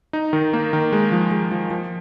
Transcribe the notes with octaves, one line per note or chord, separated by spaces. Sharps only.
D#4
D#3
A#3
D#3
G#3
F3
G#3
F3
F3